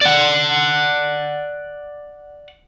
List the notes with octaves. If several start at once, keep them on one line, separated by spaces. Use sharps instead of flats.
D5 F#5